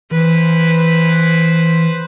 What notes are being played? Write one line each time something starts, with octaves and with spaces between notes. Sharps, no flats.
E3 B4 C5